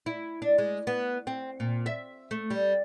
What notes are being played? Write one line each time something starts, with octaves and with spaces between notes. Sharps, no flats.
E4
D4
G#3
B3
C4
A#2
E5
A3
G3